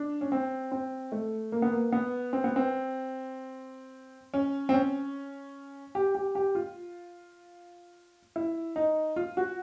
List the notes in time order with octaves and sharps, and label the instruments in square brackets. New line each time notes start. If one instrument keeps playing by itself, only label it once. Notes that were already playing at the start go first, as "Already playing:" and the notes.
Already playing: [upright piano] D4
C#4
C4
C4
A3
A#3
B3
A#3
B3
C4
B3
C4
C#4
C4
C#4
G4
G4
G4
F4
E4
D#4
F4
F#4